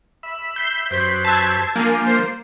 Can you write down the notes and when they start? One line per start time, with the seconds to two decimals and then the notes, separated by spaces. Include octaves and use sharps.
0.23 E5 B5
0.56 G6 C7
0.91 F#2 G4 B4 C5
1.25 A5 E6 G#6
1.76 F3 G3 A#3 D4 G#5
2.06 C5